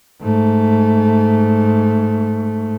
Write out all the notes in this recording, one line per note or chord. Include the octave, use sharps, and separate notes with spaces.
G#2 A3